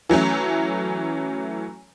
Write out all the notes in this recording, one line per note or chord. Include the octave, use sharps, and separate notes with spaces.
E3 F#3 A3 C#4